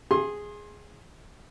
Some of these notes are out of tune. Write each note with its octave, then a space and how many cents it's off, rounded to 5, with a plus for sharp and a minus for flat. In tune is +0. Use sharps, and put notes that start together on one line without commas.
G#4 -5 C6 +25